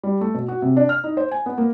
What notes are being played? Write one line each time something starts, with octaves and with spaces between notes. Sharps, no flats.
G3
A3
B2
F#4
C3
D4
F6
D#4
C5
G#5
B3
A#3